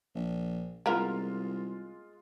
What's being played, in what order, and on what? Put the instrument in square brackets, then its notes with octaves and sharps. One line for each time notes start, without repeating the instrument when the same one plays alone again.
[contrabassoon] A#1
[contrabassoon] C2 [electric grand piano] G#3 F4 [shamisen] A#3 B3 A#4